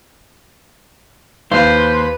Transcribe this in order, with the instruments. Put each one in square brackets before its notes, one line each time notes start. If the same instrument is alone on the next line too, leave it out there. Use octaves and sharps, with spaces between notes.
[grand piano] D#2 [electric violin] B4 [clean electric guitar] C5 [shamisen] F5